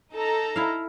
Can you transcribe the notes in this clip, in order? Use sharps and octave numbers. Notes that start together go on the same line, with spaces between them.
D#4 A4 A#5
E4 F5